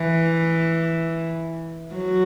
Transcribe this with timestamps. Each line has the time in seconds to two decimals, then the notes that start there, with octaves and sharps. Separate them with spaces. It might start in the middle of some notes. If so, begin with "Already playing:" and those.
Already playing: E3
1.95 F#3